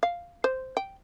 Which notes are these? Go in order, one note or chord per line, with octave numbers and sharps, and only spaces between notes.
F5
C5
G5